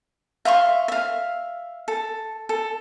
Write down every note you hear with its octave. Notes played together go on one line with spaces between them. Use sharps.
E5 F5 C6 C#6
E5 F5
A4
A4